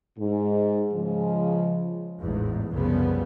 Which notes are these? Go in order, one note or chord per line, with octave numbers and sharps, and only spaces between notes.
G#2
C#3 F3 G#3
A1 E2 G#2
C2 F#2 C#3 F3 G3 B3